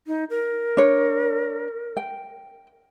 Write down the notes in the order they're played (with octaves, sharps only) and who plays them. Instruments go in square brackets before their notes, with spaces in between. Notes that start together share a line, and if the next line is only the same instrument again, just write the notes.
[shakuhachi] D#4
A#4
[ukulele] D4 C#5
G5